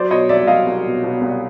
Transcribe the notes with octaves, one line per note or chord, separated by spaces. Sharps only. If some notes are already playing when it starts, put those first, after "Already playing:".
Already playing: F#3 C5 D5
B2 C#5 D#5
C2 D5 E5
F#3 D#5 F5
C2
B2
B2
C2